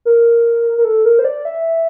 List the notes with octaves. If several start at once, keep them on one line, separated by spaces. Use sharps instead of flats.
A#4
A#4
A4
A#4
C5
D5
E5